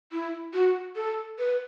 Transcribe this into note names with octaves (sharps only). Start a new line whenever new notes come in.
E4
F#4
A4
B4